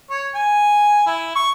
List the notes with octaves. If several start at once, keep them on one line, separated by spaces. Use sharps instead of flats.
C#5
G#5
E4
C#6